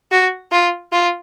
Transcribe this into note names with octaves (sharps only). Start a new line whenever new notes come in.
F#4
F4
F4